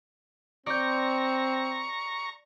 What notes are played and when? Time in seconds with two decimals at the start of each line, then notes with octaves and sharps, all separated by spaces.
0.66 C4 D5 A#5 C#6 G6